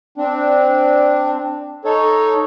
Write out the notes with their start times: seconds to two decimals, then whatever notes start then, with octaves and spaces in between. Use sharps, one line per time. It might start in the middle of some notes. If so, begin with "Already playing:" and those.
0.18 C4 D4
1.85 D#4 A4 C#5